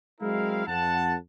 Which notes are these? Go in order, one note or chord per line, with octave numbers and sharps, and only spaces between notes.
F#3 G#3 C4 E4 A#4 F5
F2 F#5 A5